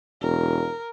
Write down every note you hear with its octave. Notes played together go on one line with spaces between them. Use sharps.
E1 A#4